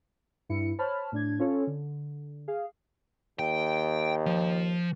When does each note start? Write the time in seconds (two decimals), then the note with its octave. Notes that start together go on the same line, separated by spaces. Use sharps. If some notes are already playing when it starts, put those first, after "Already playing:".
0.49 G2 E4 C#7
0.79 C5 C#5 A5 B5 F6
1.12 A2 D4 G#6
1.39 C#4 F4 A4 C#5
1.67 D3
2.48 G#4 F5
3.39 D#2 G5
4.26 F3